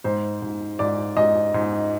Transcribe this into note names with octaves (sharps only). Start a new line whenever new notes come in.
G#2 C5
G#2
G#2 D5
G#2 D#5
G#2